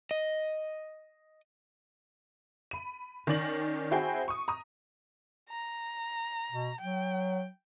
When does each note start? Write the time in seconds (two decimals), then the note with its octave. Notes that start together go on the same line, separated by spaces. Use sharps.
0.11 D#5
2.71 B5 D#7
3.27 D#3 C#4 D5 A#6 F#7
3.91 C4 E4 F#4 G#4 G5
4.28 C#6 D#6
4.48 A#5 D#6
5.50 A#5
6.52 B2
6.81 F#3 G5